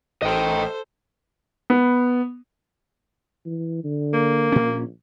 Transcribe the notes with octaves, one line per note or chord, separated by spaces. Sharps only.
A1 A4 C5 D#5 G5
B3
E3
D3
A#3
A#1 A#2 C#4